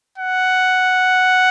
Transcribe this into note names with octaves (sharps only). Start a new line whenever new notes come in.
F#5